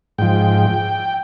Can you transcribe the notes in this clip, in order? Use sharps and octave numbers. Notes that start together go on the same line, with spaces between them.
G#2 F3 G5